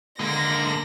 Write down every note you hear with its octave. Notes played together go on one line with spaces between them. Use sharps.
D3 G#3 A#3 A#6